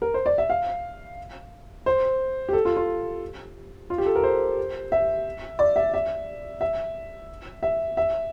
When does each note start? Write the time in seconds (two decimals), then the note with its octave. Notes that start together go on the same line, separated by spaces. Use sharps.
0.02 A#4
0.14 C5
0.26 D5
0.38 E5
0.50 F5
1.86 C5
2.49 G4
2.53 A4
2.65 F4
2.77 F4
3.90 F4
3.98 G4
4.06 A4
4.15 A#4
4.23 C5
4.92 E5
5.59 D5
5.76 E5
5.94 E5
6.61 E5
7.63 E5
7.97 E5